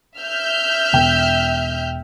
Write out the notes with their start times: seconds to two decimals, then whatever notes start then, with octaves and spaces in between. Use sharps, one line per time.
0.18 E5 F6 G6
0.93 E1 G5